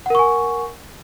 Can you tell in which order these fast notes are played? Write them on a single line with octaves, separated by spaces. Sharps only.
F#5 A#4 C#6 G#5